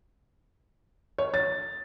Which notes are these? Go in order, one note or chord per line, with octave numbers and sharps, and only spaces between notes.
C#5
A6